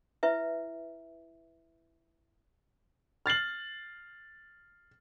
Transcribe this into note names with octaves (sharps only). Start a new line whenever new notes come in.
E4 B4 E5
F6 A6 C7 F#7